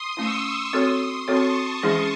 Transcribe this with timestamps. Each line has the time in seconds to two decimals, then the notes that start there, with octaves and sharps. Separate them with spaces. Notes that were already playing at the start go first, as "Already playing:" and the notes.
Already playing: C6 D#6
0.17 A3 C#4 E4 C#6 E6
0.72 C4 F#4 A4 C#5 C6 D#6
1.28 C4 F#4 A4 C#5 A5 C#6
1.83 E3 G#3 C#4 E4 G#4